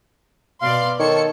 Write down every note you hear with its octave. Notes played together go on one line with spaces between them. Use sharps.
B2 D5 F5 C6
D#3 A4 C#5 C#7